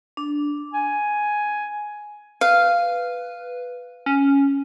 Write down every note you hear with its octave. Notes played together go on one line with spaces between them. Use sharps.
D4
G#5
B4 F5
C#4